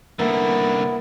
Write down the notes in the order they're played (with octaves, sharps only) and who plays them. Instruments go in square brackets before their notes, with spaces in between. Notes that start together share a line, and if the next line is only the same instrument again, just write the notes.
[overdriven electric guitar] C2 D3 [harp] A#3 [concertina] B3 E4